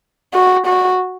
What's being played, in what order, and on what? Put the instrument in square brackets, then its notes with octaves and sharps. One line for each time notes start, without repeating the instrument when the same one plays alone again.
[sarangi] F#4
F#4